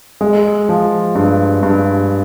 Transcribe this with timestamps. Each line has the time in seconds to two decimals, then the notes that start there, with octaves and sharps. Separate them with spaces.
0.21 G#3
0.69 F3
1.15 G2
1.63 G2